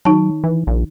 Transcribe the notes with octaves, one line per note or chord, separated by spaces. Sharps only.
D#3 F#3 D#4 A5
E3
A#1